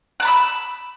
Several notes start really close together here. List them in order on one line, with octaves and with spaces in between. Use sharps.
F#6 A5 B5 E6